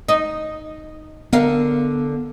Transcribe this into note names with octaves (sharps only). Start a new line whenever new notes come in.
D#4
D3 B3 A#4 F5